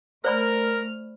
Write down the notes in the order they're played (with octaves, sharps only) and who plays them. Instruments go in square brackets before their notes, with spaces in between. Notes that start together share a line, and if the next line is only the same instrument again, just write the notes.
[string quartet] A3 F6 [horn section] A#4 [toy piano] C5 D5 B5